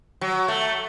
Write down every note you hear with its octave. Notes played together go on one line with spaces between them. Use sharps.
F#3
A3